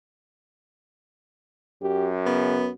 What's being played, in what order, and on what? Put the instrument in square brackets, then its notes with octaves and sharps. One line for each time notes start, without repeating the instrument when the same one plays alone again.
[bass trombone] F#2 [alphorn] G4
[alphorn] C#3 [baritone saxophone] B3